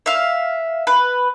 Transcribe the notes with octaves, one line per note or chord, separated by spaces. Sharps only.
E5 F5
B4